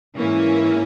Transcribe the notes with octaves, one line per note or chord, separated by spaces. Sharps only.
G#2 E3 A#3 C#4